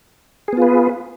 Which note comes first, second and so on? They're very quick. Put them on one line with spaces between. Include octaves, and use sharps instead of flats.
G#4 B3 F4 B4